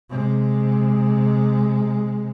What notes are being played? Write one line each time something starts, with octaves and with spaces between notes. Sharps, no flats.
C3 G#3